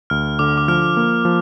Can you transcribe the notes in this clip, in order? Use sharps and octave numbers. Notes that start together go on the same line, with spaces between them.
D2 F6
D3 D6
D6
F3 F6
A#3
F3